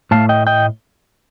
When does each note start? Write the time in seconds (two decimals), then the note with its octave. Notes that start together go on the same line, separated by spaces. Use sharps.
0.11 A2 A3 F5 A5
0.29 D#5 G5
0.47 D#5 G5